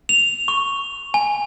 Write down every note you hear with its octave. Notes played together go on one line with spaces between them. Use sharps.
F7
C#6
G#5